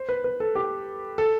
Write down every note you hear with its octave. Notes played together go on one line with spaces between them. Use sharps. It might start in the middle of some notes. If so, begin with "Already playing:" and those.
Already playing: C5
B4
B4
A4
G4
A4